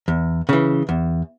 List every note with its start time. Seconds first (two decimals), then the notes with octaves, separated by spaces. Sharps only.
0.08 E2
0.49 C#3 E3
0.89 E2